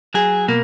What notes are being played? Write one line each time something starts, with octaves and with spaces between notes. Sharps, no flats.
F#3 G#4
B2 A#3